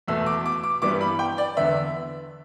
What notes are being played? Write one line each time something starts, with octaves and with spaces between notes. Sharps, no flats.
E2 B2 A3 E6
D6
D6
D6
G2 E3 G3 B3 D6
B5
G5
D5
E2 D3 B3 E5